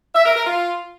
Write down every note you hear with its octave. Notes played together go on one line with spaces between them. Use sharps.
E5
A#4
A#4
F4